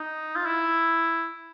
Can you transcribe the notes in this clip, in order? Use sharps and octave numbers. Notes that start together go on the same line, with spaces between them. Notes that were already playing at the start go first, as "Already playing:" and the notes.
Already playing: D#4
F4
E4